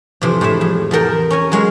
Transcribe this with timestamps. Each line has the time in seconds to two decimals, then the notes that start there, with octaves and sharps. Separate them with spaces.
0.22 F2 C3 E3
0.41 A2 G#3 E4 E5
0.61 F2
0.91 E2 A4 A#4 G5
1.30 C#4 A#4 G#5
1.52 F#3 G#3 C#5 F5